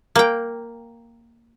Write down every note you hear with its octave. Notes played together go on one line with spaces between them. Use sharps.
A#3 G5